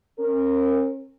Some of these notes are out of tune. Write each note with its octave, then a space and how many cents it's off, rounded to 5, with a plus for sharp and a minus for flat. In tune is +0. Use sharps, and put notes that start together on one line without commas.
C#4 -45 A#4 -15